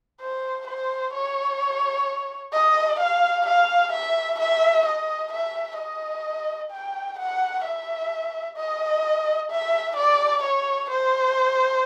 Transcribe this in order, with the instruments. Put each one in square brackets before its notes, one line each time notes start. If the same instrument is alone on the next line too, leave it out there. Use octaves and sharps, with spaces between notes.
[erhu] C5
C5
C#5
D#5
F5
F5
E5
E5
D#5
E5
D#5
G5
F#5
E5
D#5
E5
D5
C#5
C5